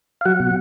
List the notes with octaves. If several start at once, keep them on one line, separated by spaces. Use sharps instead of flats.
F5
F#3 F#5
B2